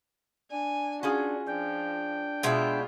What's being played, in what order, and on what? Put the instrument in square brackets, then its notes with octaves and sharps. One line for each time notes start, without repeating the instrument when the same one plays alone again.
[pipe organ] D4 [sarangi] G#5
[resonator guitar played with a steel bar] C#4 F4 G#4 [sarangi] F#4
[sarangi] F3 [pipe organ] D4 G5
[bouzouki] B2 G#3 E5 [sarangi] F4